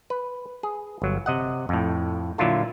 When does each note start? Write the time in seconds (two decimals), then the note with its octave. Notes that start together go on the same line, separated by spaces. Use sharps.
0.10 B4
0.63 G#4
1.02 G1 F#3
1.26 C3 D#5 F#5
1.69 F2 A2
2.38 A#2 D3 F#3 E4 F4 A4